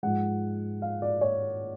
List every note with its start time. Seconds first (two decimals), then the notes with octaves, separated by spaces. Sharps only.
0.03 G#2 F3 G#3 F#5
0.82 F5
1.02 D5
1.21 C#5